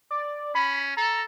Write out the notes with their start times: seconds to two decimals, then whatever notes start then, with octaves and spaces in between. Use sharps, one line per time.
0.11 D5
0.55 C#4 B5
0.97 A4 A#5